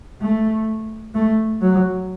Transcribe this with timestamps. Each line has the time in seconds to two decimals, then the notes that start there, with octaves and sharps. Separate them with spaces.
0.21 A3
1.15 A3
1.62 F#3